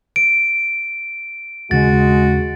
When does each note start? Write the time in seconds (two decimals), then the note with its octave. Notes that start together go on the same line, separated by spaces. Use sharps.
0.16 D7
1.71 D#2 C#3 G#3 C#4 F#4 A6